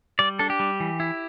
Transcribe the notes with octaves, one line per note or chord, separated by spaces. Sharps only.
G3 D5
D4 A4
G4
G3
E3
E4